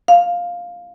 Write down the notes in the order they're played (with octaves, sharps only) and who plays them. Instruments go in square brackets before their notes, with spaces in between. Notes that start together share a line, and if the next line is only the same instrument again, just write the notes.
[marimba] F5